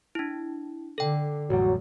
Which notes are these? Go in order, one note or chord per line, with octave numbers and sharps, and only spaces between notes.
D4 E4
D3 A4 G5
A1 F2 A2 F#3 G3